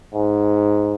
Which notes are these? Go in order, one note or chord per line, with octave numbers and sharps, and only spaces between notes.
G#2